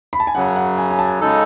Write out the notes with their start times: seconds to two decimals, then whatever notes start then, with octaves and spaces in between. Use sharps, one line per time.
0.13 B5
0.20 A5
0.27 G#5
0.34 F#2 C#3 F#3 F#5
0.56 F#5
0.78 G#5
0.91 G#5
0.99 A5
1.21 C#3 G#3 D#4 A4